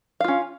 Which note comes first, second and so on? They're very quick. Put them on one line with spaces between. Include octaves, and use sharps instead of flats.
F5 F4 C#4